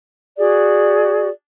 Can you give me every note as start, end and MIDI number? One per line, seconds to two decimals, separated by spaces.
0.37 1.28 66
0.37 1.28 68
0.37 1.28 74